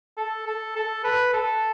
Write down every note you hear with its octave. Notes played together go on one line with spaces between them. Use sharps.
A4
A4
A4
B4
A4